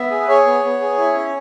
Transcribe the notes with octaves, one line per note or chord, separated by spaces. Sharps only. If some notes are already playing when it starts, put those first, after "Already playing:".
Already playing: B3 E5
G#4
B4
G#4 C#5
B3
B3
G#4
E4
C#4